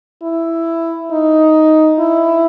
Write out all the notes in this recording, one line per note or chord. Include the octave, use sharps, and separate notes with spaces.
E4
D#4
E4